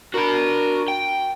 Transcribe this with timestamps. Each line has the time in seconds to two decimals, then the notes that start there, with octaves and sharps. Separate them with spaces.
0.14 D4 F#4 A#4 B5
0.88 G5